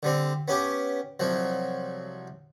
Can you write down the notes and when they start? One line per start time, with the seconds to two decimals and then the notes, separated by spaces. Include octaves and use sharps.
0.03 D3 G3 C4
0.48 B3 C#4 G4
1.20 C2 F3 F#3